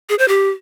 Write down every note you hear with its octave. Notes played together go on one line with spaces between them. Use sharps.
G#4
C5
G4